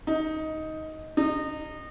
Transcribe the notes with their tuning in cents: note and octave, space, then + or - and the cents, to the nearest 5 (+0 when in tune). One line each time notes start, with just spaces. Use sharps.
D#4 +10
D#4 -25